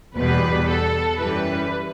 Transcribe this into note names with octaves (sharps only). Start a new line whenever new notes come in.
E2 B2 G3 B4
A4
F#2 E3 G3 B4